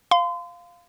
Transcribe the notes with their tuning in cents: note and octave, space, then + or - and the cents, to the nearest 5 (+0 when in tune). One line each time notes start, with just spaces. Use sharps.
F5 +0 C6 -35